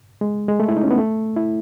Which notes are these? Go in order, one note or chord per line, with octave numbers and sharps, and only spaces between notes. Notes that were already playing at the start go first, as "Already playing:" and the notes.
G#3
G#3
A3
E4
D#4
C#4
B3
A3
E4